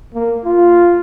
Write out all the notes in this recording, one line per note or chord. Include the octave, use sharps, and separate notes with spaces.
A#3
F4